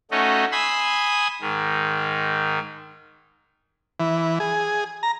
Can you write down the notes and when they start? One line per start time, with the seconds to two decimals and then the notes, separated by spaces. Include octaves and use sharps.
0.11 A3 C#4 D#4 F#4
0.52 G#5 B5 C6 D#6 E6
1.41 G#2 D#3
4.00 E3
4.40 G#4
5.03 A#5